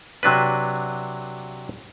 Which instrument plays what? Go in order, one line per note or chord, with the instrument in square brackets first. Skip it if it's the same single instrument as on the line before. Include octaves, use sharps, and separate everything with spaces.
[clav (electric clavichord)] C3 F#3 D4 B4